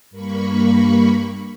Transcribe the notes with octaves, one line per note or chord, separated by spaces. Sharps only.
G2 A#3 B5 C#6